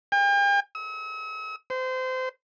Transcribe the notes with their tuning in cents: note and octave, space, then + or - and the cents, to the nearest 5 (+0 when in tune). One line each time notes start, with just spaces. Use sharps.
G5 +45
E6 -45
C5 -25